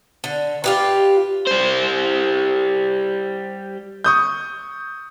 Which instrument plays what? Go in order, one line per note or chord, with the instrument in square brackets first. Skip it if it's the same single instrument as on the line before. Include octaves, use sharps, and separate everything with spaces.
[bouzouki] D3
F4 G4 B4
[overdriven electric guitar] G3 C5
[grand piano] C#6 D#6 G6